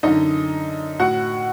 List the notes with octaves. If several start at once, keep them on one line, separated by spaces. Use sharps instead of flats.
F#2 D3 D#4 D#5
A2 F#4 F#5